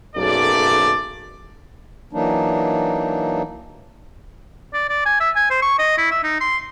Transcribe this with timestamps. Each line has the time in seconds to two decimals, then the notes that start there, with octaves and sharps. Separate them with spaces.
0.16 B1 F#2 A3 A#3 G#4 D5
2.13 E3 F#3 A#3 D4 D#4
4.74 D5
4.89 D5
5.06 G#5
5.20 E5
5.35 G#5
5.50 C5
5.62 C#6
5.79 D#5
5.98 E4
6.11 E5
6.24 D#4
6.40 C6